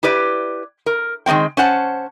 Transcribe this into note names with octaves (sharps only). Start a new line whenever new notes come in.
E4 G4 B4 D5
A#4
D#3 G#3 A#3 C4 G5
C#4 C5 F#5 A5